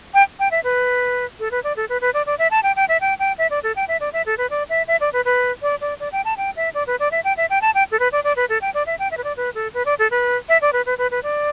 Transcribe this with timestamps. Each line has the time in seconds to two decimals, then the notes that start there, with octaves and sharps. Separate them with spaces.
0.14 G5
0.40 G5
0.51 E5
0.64 B4
1.40 A4
1.51 B4
1.64 D5
1.77 A4
1.89 B4
2.01 B4
2.14 D5
2.26 D5
2.39 E5
2.51 A5
2.63 G5
2.76 G5
2.89 E5
3.01 G5
3.19 G5
3.38 E5
3.51 D5
3.63 A4
3.76 G5
3.88 E5
4.00 D5
4.13 E5
4.26 A4
4.38 B4
4.50 D5
4.69 E5
4.88 E5
5.01 D5
5.13 B4
5.25 B4
5.62 D5
5.81 D5
6.00 D5
6.12 G5
6.25 A5
6.37 G5
6.56 E5
6.74 D5
6.87 B4
7.00 D5
7.12 E5
7.24 G5
7.37 E5
7.50 G5
7.62 A5
7.75 G5
7.91 A4
8.00 B4
8.12 D5
8.24 D5
8.36 B4
8.49 A4
8.62 G5
8.74 D5
8.86 E5
8.99 G5
9.11 E5
9.17 B4
9.24 D5
9.37 B4
9.55 A4
9.74 B4
9.86 D5
9.99 A4
10.11 B4
10.49 E5
10.62 D5
10.73 B4
10.86 B4
10.98 B4
11.11 B4
11.23 D5